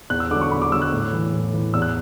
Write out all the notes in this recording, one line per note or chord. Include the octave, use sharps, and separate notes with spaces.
E2 F#6
E6
D3 F#3 D6
C#6
E2 B5
D6
D3 F#3 E6
F#6
A2
E3
A2
E3
E2 E6
F#6